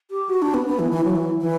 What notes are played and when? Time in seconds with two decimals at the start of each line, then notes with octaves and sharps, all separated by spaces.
0.11 G4
0.29 F#4
0.42 D4
0.54 B3
0.67 B3
0.79 E3
0.91 E3
1.04 F#3
1.16 E3
1.41 E3